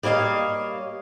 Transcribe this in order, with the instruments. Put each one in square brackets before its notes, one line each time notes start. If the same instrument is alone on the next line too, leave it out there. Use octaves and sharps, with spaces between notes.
[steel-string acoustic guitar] G3 A#3 C#5 D#5 F5